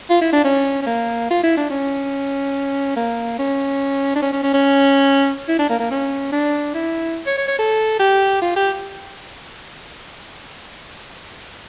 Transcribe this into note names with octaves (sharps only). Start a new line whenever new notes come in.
F4
E4
D4
C#4
C#4
A#3
F4
E4
D4
C#4
A#3
C#4
D4
C#4
C#4
C#4
C#4
E4
D4
A#3
A#3
C#4
D4
E4
C#5
C#5
C#5
A4
G4
F4
G4